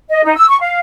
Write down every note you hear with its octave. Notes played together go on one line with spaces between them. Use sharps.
D#5
D#4
E6
C#6
F5